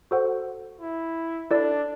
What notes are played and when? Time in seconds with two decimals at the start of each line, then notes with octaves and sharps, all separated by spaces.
0.11 F#4 A4 C5 F#5
0.81 E4
1.51 D4 E4 A4 D5